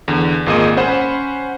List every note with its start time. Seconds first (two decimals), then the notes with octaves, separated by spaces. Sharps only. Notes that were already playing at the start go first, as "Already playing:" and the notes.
0.08 E2 D3
0.46 G#1 A#2 A#3 G#4 D#5 D#7
0.77 C#4 C5 F#5 B5 E7